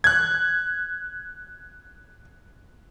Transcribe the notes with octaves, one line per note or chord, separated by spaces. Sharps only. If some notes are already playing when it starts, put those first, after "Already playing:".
F#6 G#6